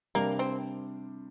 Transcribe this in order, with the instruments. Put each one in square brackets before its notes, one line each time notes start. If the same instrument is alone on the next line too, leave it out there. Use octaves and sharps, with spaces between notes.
[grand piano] C3 G3 D4 [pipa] A#3
[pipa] C4